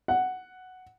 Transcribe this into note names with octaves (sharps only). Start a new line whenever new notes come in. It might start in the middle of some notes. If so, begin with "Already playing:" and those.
F#5